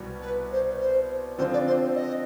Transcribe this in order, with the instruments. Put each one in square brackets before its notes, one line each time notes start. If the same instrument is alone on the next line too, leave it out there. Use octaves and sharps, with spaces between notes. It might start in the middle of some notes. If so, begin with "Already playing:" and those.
Already playing: [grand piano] C2 B2 G3 B3
[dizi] B4
C5
C5
[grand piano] D3 F3 C4 F4 [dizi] C5
[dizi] D5
C5
D#5